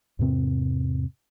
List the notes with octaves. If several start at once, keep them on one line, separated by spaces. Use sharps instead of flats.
E2 G#2 C3 C4